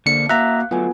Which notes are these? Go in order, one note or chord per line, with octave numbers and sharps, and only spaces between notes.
D3 A#3 D4 C#7
A#3 F#4 E5 F5 A#5 F#6
D3 F#3 A3 B3 F4 G#5